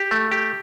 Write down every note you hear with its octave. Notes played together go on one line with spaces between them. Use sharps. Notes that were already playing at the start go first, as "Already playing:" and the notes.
Already playing: G4
A3
G4